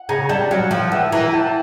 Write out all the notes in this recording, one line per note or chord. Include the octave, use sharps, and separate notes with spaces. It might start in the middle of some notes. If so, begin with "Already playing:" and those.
Already playing: F#5
C#3 G#5 A#5
G3 G5 A5
F#3 F5 G5
F3 F5 G5
G5
E3 E5 F#5
E3 G#5 A#5
G5 A5